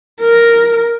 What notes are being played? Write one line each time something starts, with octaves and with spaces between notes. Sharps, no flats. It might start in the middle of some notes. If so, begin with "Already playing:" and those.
A#4